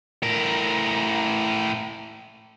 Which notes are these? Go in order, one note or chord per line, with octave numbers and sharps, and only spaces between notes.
A2 A#4